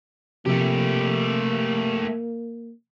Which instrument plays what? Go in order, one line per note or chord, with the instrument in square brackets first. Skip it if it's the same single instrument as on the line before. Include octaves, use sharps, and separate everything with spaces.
[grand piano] C3 F3 [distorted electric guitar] A3 G4 [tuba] A#3